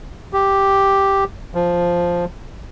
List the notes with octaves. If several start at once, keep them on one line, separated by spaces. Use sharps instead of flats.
G4
F3